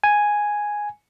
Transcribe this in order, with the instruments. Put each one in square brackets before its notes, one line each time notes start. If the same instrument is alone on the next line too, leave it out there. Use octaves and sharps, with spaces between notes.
[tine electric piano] G#5